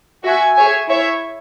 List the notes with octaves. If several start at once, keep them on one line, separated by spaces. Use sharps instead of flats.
F#4 E5 G#5
G#4 C#5 E5 G#5
E4 C#5 E5